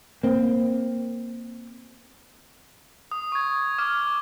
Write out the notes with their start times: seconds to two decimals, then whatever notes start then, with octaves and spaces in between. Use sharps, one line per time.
0.23 A#3 C4
3.11 D#6
3.32 C#6 G#6
3.78 D6 F6